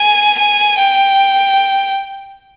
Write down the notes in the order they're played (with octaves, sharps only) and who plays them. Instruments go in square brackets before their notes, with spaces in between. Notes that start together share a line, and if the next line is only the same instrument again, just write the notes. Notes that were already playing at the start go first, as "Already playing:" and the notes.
Already playing: [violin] G#5
G#5
G5